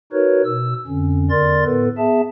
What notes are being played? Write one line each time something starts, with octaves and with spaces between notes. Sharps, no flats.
D#4 F#4 A#4 B4 C#5
B2 E6
F2 D3 C#4
E2 D3 A#4 D5 C6 A6
A2 B3 A4 B4
B3 G#4 E5 A5